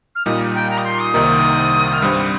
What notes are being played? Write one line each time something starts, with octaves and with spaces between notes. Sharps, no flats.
F6
A#2 G3 D#4 D#6
G5
A#5
D#6
C6
D#6
C2 C3 D#3 A#3 D#4
F6
G2 G3 C4 D#6